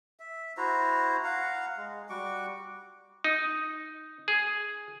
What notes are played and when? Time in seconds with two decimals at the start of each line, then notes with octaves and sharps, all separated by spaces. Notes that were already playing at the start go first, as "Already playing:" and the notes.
0.20 E5
0.57 E4 F#4 C5 A#5
1.24 F5 F#5 A#5
1.77 G#3
2.09 G3 F#4 C#6 D6
3.24 D#4
4.28 G#4